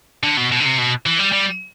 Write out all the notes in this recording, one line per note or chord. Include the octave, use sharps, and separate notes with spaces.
D3
B2
B2
D3
C3
B2
E3
G3
G3